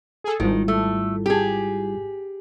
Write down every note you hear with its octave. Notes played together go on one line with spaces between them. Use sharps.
G#4 A4
G#1 G#2 D#3 G3 E4 F4
A3
G4 G#4